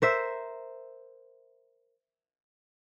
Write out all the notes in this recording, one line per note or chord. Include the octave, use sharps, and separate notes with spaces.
A#4 C5 E5